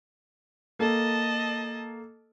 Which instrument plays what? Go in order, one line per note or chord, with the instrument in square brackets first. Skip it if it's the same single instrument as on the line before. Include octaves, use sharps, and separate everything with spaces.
[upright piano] A#3 A4 [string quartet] D#5 A5